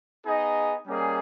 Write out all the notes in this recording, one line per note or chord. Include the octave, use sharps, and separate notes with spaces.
B3 D#4 G#4 D#5
G3 A#3 C#4 G#4 D#5